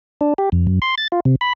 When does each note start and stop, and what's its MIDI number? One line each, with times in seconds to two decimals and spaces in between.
0.21 0.34 62
0.38 0.49 67
0.52 0.67 41
0.67 0.79 42
0.82 0.95 84
0.98 1.08 93
1.12 1.20 65
1.25 1.36 48
1.41 1.53 83